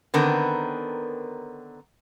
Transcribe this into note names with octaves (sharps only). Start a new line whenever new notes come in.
D3 D#3 B3 C4 A#4